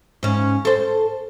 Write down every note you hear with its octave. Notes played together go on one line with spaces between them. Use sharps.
G#2 C#4
A4 C5